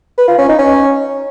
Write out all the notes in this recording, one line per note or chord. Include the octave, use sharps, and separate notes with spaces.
B4
F4
C#4
D#4
C#4